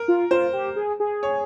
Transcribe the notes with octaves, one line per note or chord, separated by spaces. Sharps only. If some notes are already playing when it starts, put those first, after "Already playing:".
Already playing: A#4
F4
F4 C5
G4
G#4
G#4
C#5